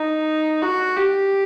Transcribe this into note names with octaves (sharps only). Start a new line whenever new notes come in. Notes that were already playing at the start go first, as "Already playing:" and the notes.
Already playing: D#4
F#4
G4